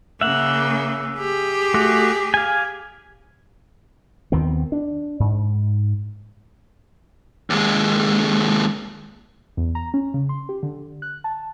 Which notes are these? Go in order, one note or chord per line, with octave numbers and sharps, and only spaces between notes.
C#3 A#3 E5 F#5
G4 G#4
A3 F#4
F5 G#5
D#2 D#3 B3 C4
D4
G#2
D#2 G#3
E2
A#5
C#4
C#3
C6
G4
D3
F#6
A5